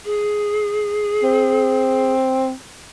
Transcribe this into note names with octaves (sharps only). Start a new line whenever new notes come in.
G#4
C4